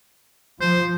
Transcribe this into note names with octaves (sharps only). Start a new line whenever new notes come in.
F3 C5